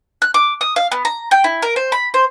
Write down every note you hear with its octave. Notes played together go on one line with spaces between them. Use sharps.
F#6
D6
D#6
F5
B3
A#5
G5
E4
A#4
C5
B5
C5